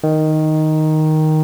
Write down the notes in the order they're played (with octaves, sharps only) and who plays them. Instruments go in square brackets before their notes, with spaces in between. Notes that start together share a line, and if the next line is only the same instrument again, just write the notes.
[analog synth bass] D#3